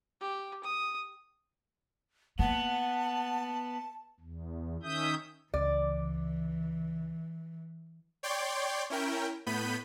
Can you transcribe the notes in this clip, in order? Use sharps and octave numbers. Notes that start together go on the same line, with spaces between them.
G4
D#6
A#3 B3 F#5 A5
E2
D#3 C#4 E5 D#6 G6
C#2 E3 D5
C#5 D5 G5 C6 D6
C#4 E4 A#4 G5
A2 B3 B5 G6 D#7